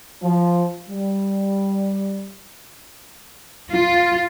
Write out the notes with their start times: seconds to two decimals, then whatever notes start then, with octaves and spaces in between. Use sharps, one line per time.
0.22 F3
0.90 G3
3.71 F4